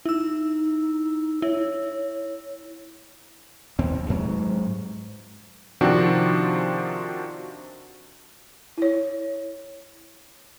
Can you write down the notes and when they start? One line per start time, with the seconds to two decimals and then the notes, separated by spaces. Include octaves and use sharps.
0.06 D#4 E4 E6
1.42 E4 C#5
3.79 D#2 C4
4.10 G#2 F#3
5.81 C3 D#3 F3 C4 D4 F#4
8.78 E4 C#5